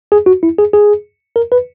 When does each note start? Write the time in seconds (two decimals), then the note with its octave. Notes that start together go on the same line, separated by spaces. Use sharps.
0.12 G#4
0.26 F#4
0.43 E4
0.58 G#4
0.74 G#4
1.36 A#4
1.52 B4